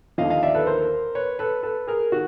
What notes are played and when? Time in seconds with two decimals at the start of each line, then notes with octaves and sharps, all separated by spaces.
0.18 D#2 D3 F3 D#5 F5
0.30 D#5 F5
0.43 D5 E5
0.54 A4 B4
0.67 A#4 C5
1.15 B4 C#5
1.39 A4 B4
1.63 A4 B4
1.87 G#4 A#4
2.12 D#3 F#4